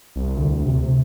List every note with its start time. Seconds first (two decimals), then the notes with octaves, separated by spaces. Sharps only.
0.16 C2
0.37 D2
0.66 C3